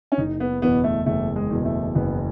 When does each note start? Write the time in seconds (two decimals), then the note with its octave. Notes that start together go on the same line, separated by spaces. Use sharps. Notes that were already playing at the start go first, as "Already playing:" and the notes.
0.12 C#4
0.18 F#1 D#4
0.40 B3
0.62 E2 B2 B3
0.84 A3
1.06 F#1 A3
1.36 G#3
1.51 E2 B2
1.65 A3
1.95 F#1 B3